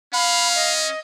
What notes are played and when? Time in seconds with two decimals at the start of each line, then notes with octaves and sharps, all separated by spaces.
0.13 C#4 F5 B5
0.55 D#5